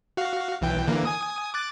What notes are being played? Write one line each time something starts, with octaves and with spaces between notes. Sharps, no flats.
F#4 F5
B1 E3 G5
D3 E3 A#3
G#5 D#6
D6 F#6 A6